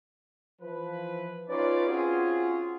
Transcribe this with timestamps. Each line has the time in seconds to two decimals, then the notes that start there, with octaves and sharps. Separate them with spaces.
0.61 E3 F3 B4
1.49 C#4 D#4 F4 B4 C#5 D5
1.88 C4 C#4 F4 F#4 G#4